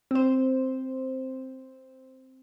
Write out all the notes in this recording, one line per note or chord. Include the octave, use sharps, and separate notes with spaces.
C4 C5